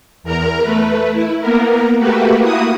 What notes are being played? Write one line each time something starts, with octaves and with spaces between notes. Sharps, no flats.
E2 A#4 A#5
A3 B4
E4
A#3 B3 A#4
A3 A#3 F#4 G4 B4
A#3 E4 F#4 D#6